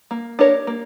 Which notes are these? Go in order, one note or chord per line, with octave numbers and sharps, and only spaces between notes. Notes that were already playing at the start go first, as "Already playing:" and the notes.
A#3
D4 G4 A#4 C#5
A#3